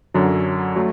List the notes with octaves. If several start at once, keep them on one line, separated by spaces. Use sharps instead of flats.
F#2 D3 F#3
F#3 A3